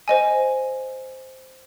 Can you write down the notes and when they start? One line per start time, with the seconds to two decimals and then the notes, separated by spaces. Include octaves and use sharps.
0.08 C5 D#5 G#5